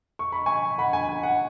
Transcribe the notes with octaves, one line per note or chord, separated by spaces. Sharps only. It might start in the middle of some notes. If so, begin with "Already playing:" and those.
C#6
B5
G#5 C#6
F#5 B5
G#5
G#5
F#5